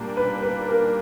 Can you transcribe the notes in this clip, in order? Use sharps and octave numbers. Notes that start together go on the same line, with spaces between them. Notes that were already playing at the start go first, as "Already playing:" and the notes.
Already playing: A#2 G3 A#3 D4
B4
B4
A#4